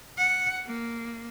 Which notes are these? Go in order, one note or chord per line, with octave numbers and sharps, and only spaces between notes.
F#5
A#3